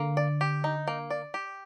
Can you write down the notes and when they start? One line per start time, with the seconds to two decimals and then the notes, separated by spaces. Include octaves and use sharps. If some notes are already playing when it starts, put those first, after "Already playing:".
Already playing: D3 A#3
0.17 D5
0.41 G4
0.64 D#4
0.88 A#3
1.10 D5
1.34 G4